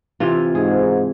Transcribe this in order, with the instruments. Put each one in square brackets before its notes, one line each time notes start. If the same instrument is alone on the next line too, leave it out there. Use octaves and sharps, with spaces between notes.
[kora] C3 E3 F4
[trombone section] G#2 [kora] G#4